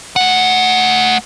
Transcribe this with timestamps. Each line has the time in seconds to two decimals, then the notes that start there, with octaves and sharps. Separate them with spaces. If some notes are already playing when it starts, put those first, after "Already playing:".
0.16 A3 F#5